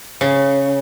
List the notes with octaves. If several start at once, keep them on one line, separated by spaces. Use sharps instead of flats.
C#3